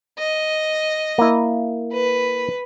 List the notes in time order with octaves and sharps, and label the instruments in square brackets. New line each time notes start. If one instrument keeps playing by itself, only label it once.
[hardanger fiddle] D#5
[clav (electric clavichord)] A#3 E4
[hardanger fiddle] B4